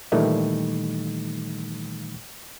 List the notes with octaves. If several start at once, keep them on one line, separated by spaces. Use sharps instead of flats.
A#2 D#3 E3 G3 A3 D#4